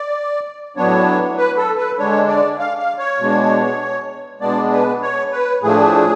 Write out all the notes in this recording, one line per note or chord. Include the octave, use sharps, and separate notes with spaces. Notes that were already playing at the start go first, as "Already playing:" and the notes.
Already playing: D5
A2 F#3 B3 D4 C#5
B4
A4
B4
D3 G#3 D4 C#5
D5
F5
F5
C#5
B2 G#3 D4
B2 G#3 B3 D4 D5
B4
C#5
B4
A2 F3 A3 D4 G#4